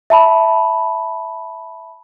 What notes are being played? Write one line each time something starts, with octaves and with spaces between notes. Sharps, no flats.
E5 A5 B5